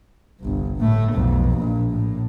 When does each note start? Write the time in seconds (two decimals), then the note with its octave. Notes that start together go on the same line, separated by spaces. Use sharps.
0.40 G1 C2
0.77 A2 A3
1.13 B1 F2
1.58 A#1 A#2
1.91 A2